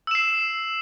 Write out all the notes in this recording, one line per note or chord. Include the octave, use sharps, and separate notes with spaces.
E6 C7 E7